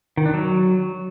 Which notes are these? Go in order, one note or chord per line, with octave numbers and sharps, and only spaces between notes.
D#3
D4
F#3